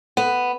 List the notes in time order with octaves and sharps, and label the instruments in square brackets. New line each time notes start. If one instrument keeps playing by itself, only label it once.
[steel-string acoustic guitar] B3